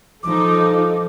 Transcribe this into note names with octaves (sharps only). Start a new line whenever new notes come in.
F3 D#4 A4 D6